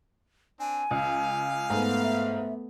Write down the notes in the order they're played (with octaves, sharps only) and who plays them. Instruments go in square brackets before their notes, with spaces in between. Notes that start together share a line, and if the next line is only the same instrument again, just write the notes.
[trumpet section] C4 D4 [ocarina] G#5
[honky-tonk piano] C#2 [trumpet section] F5
[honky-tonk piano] G#2 [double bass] A3 B3
[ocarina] E5